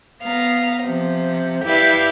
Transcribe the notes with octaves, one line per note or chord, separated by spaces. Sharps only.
B3 F5 A#5
C3 F3
E4 G4 B4 D5 E5 F5